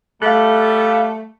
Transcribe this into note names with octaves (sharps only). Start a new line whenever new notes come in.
G3 A3 A4 F5 F#6